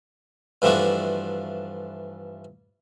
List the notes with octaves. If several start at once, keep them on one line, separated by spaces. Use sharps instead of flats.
G2 E3 F3 A3 D4 F#4